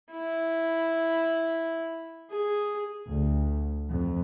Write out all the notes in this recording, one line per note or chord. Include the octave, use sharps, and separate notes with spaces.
E4
G#4
D2
F2